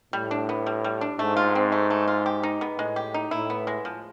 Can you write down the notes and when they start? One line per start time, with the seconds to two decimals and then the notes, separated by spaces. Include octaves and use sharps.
0.13 A2 G3
0.31 D4
0.49 B3
0.66 G3
0.84 G3
1.01 D4
1.19 G#2 A3
1.37 F4
1.55 C4
1.72 A3
1.90 A3
2.08 F4
2.26 G4
2.43 D#4
2.61 B3
2.79 A2 G#3
2.96 G4
3.14 D#4
3.31 A2 E4
3.50 B3
3.67 G#3
3.85 F3